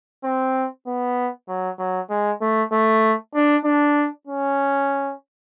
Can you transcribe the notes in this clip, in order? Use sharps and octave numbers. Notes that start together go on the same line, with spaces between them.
C4
B3
F#3
F#3
G#3
A3
A3
D4
D4
C#4